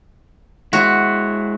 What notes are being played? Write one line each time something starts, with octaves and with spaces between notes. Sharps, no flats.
G#3 E4 F#4